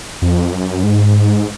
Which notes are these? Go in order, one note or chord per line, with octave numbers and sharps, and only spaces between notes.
F2
F#2
G#2